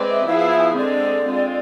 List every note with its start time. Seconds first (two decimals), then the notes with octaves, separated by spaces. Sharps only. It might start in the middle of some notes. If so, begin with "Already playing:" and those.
Already playing: G#3 C4 B4 D5
0.10 E5
0.26 F3 B3 E4 G#4 F5
0.39 F5
0.51 F5
0.59 G#5
0.63 F5
0.76 D3 G#3 C4 D5
1.26 G#3 C4 F4